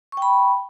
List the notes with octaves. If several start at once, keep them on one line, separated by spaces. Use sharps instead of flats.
G5 B5 C#6